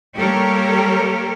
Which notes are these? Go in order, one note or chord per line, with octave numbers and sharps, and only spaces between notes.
G3 A#3 G4 A4 A#4 C#5